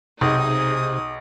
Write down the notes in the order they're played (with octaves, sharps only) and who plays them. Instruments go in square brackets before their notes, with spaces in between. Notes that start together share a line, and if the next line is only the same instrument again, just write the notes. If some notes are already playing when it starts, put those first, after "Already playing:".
[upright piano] B1 [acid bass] C3 [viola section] D#4 G#4 [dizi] D#6